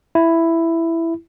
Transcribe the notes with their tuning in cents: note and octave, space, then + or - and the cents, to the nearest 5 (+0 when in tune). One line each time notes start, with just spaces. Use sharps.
E4 +5